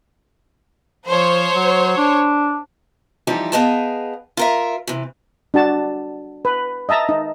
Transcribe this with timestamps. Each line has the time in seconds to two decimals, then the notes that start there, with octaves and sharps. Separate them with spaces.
1.08 F3 C5 C#5
1.55 F#3
1.97 D4
3.27 E3 F3 G3 D#4 G4
3.52 B3 G#4 D#5 F5 G5 A5
4.37 F4 A#4 E5
4.87 C3 E3
5.54 D4 F#4 A5
6.45 B4
6.89 D#5 E5 A5 A#5
7.09 D#4